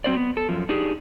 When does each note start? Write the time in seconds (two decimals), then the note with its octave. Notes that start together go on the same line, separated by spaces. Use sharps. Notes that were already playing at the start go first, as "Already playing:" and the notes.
0.04 F#3 C4 C5 D5
0.16 B3
0.37 A4
0.49 F#2 F3
0.69 D4 D#4 G4 G#4